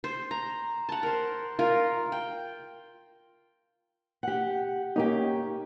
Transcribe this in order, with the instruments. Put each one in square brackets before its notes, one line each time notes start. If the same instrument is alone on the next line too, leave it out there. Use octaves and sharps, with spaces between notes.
[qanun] C5
A#5
F#5 A5
A#4 C5
F4 A#4
G5
[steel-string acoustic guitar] G4 F#5
[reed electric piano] A#3 D#4 [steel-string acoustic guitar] C#4 G4